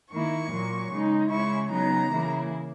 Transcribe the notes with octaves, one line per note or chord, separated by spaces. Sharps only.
D#3 A#3 E4 C#6
A#2 F#3 A#3
C#3 G#3 D#4
C#3 G#3 C#4 E4 C#6
C#3 F#3 B3 D#4 A#5
C#3 E3 A#3 E4